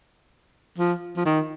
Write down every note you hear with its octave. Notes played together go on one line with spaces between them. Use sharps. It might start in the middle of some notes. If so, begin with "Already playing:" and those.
F3
F3
D#3